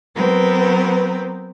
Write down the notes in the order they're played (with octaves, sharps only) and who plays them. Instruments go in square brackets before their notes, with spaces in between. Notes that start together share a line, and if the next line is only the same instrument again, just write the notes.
[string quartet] F#3 B3 C4 A#4 B4